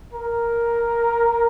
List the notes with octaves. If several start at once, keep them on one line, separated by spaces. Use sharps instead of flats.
A#4